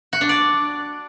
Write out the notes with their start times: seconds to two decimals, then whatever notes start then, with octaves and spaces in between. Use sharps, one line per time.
0.13 F#4
0.21 D4
0.29 D5